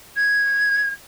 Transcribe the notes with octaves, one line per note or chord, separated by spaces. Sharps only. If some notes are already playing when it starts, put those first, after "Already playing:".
G#6